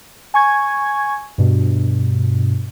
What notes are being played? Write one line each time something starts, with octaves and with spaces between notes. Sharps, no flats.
G#5 C#6 G#6
G2 B2